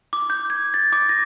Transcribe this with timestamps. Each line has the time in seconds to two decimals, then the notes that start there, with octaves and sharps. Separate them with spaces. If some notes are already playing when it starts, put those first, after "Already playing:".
0.13 D6
0.30 G6
0.50 G#6
0.74 A6
0.92 D6
1.09 A#6